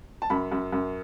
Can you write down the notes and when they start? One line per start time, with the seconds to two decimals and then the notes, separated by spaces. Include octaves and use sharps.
0.22 A5
0.30 F#2 B5
0.52 F#2
0.72 F#2